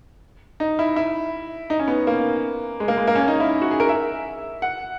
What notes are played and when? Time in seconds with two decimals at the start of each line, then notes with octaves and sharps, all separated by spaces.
0.60 D#4
0.79 E4
0.96 E4
1.70 D#4
1.80 C#4
1.88 B3
2.07 A#3
2.80 G#3
2.88 A#3
2.98 G#3
3.07 A#3
3.15 C#4
3.28 D#4
3.40 E4
3.62 F#4
3.71 G#4
3.80 A#4
3.89 E5
4.62 F#5